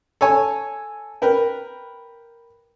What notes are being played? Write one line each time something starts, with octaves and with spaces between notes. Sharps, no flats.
A4 C#5 G#5
A#4 B4 G5